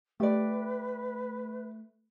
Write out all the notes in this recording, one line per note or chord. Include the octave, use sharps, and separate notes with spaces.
A3 G4 B4 D5